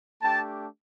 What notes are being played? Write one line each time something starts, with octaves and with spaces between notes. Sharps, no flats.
A3 D4 G4 G5 A5